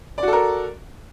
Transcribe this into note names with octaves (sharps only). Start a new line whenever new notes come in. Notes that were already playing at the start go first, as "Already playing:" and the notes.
F#4 A4 A#4 D5